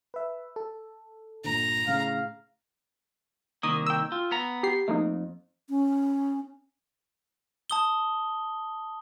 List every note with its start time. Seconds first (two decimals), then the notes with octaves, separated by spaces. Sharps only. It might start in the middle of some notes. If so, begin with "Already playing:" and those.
0.14 B4 E5
0.56 A4
1.44 G1 A#2 D3 A#5
1.87 A2 C#3 F5
3.63 C2 D#3 A#3 D#6
3.87 G5 E6
4.12 F4
4.31 B3 A#5
4.63 G4 C7
4.88 F2 A3 A#3 D#4
5.69 C#4
7.70 A5 D#6 G7